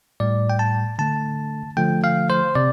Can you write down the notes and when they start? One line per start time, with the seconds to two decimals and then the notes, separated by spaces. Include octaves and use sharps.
0.20 A2 G3 D5
0.50 G5
0.59 A5
0.99 D3 A3 A5
1.77 D3 F3 A3 G5
2.04 F5
2.30 C5
2.55 C3 D5